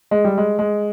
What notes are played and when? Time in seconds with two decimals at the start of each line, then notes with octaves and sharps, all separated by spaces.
0.11 G#3
0.24 G3
0.38 G#3
0.59 G#3